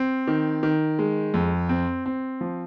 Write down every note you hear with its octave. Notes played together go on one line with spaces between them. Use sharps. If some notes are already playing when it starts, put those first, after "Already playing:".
Already playing: C4
D#3
D#3
G#3
F2
C4
C4
F3